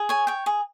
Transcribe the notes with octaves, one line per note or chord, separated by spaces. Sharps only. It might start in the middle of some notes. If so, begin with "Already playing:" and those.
Already playing: G#4
C#5 G#5
C#5 G5
G#4